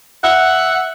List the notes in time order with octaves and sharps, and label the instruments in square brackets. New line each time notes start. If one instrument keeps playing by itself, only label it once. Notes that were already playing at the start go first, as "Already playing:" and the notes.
[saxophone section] E5 F#5